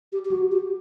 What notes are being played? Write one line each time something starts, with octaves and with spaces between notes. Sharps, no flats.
G4
G4
F#4
G4